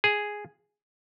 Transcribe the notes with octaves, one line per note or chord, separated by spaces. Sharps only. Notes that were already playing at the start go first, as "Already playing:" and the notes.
G#4